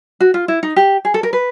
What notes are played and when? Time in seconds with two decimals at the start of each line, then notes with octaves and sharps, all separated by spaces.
0.20 F#4
0.34 F4
0.48 E4
0.63 D#4
0.76 G4
1.05 G#4
1.14 A4
1.23 A#4
1.33 B4